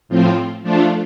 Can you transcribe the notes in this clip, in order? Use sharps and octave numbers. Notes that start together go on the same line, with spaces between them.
A2 F3 C4 F4
F3 A3 D4 F4